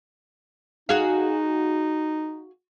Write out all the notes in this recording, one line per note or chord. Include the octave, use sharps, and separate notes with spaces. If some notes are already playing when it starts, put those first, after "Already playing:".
D#4 F#4 G#4 F5